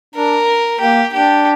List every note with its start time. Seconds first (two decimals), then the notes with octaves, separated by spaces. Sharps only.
0.15 D4 A#4
0.80 A#3 G4
1.13 D4 G4